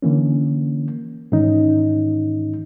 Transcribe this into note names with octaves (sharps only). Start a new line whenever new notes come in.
D3 E3 A#3 C#4
G#2 D#3 E3 C#4 D#4